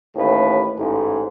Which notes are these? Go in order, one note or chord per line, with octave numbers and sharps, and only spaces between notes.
A1 D#2 A2 B4
A1 G#2